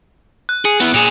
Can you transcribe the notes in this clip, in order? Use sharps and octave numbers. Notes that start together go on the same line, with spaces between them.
F#6
G#4 C#7
B3 E4
A#2 G#4 C#7 E7 F7